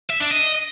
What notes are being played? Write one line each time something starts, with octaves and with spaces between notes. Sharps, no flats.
E5
D4
D#5